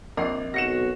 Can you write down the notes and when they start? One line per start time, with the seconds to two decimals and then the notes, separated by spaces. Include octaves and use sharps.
0.17 A#1 C4 A#4 D5 D#5 C7
0.54 B1 F#4 A#6 C#7 E7